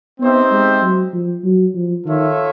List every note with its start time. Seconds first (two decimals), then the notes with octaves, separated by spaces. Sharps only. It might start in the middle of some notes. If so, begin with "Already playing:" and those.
0.19 B3 C4 D#4 G4 C5 E5
0.51 G#3
0.82 F#3
1.13 F3
1.44 F#3
1.75 F3
2.05 D#3 F4 A4 C#5 E5